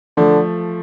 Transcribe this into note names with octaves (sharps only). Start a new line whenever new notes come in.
D3 F3 A3